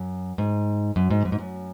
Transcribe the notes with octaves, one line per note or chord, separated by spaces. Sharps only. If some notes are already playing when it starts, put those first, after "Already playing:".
Already playing: F#2
G#2
F#2
G#2
F#2
G#2
F#2